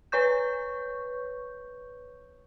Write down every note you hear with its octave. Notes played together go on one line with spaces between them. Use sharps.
B4 C#5 C#6 G6